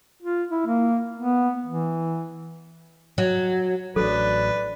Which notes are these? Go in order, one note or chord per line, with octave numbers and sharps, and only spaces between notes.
F4
E4
A#3
B3
E3
F#3
A1 F#3 D4 A4 B4